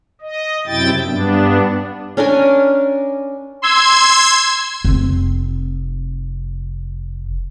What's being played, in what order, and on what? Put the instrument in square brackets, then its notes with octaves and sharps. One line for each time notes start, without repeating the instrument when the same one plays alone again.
[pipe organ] D#5
F#2 C3 E4 G5 A6
G2 B3 D4
[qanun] C#4 D4 A#4 G#5
[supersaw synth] C6 E6 G#6
[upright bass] F1 C4